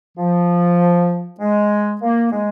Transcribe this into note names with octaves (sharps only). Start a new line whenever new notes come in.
F3
G#3
A#3
G#3